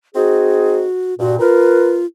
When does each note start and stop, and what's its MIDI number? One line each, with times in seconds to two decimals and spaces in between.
0.15 0.84 60
0.15 0.84 63
0.15 1.14 66
0.15 0.84 68
1.19 1.37 43
1.19 1.37 46
1.19 1.38 66
1.40 2.06 65
1.40 1.97 70
1.40 1.97 71